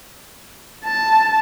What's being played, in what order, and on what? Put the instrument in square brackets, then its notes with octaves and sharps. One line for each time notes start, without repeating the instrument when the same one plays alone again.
[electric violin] A5